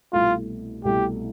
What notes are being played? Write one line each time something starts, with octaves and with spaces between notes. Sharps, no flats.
C2 B2 A3 E4 F4
C2 B2 A3 E4 G4